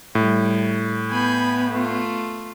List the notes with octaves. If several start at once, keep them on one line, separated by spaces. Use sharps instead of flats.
A2 G3
B3 G#5 B5 G6
A3 F4